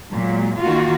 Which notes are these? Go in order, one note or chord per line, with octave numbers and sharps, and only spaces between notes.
A#2 F#3 G#3
D#3 A#3 F4 F#4